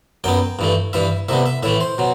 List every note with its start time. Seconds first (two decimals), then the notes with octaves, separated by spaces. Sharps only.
0.24 F#2 F#3 B3 G5
0.59 G2 E3 A3
0.93 G2 E3 G3 E5
1.29 C2 C3 G3 B3 E5
1.46 E5
1.63 A2 E3 A3 E5
1.81 C5
1.98 B2 F#3